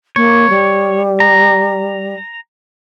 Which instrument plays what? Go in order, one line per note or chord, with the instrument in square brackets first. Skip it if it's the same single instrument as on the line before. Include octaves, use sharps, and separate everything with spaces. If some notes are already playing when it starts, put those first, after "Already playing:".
[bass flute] A#3 [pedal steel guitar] C#5
[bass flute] G3
[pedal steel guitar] A#5